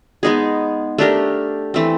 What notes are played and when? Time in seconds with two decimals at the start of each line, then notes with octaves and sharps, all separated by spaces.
0.23 G#3 B3 D#4 G#4
0.98 A3 D4 G4 A#4
1.74 E3 A3 C4